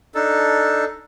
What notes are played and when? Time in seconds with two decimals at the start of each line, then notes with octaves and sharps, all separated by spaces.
0.15 D4 D#4 A4